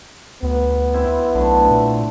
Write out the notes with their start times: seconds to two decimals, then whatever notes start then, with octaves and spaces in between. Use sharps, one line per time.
0.43 D2 B3
0.94 C4 E4
1.35 B1 D3 A3
1.71 A#2